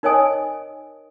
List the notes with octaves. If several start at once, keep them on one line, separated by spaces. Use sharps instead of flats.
D#4 A#4 C#5 D#5 G#5 D#6